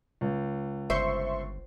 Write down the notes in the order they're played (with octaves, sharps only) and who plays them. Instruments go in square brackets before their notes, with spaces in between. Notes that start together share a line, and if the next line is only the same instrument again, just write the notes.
[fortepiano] C#2
[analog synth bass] G1 [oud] C5 [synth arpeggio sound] E5 C6 C#6